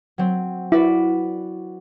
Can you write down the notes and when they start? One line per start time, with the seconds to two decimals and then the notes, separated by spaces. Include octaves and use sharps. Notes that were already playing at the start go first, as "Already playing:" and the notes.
0.18 F#3 C4
0.72 E4 F#4 B4 D5